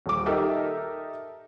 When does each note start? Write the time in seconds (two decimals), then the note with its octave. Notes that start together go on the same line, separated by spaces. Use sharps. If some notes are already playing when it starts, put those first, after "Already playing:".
0.06 D#1 D6
0.26 D#4 G4 A4 A#4 E5